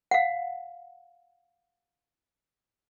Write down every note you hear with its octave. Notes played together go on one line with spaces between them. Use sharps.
F5 F#5